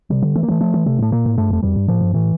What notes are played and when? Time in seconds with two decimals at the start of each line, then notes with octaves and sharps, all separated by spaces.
0.10 C3 G3
0.23 D3
0.36 E3 A3
0.43 A#3
0.48 E3 A3
0.61 F3 A3
0.74 E3
0.86 C3 A3
0.99 A2 A3
1.12 A#2 A#3
1.25 A2
1.37 G2 A3
1.50 F2 A3
1.63 F2 G3
1.76 G2
1.88 A2 F3
2.01 G2
2.14 A2 E3